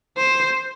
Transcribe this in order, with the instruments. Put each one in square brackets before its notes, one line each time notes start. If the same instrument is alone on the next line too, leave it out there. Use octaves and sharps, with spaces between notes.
[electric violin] C5